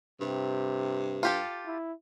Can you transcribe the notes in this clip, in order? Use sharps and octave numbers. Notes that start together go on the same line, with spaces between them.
G2 C3
F4 G4 A4
E4